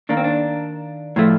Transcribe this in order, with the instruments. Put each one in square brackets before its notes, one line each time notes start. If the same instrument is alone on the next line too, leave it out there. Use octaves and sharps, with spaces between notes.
[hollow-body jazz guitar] D#3 A#3 D4
C4
D4
A2 F3 A3